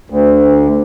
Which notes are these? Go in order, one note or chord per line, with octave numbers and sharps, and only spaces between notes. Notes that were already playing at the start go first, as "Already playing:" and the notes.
D2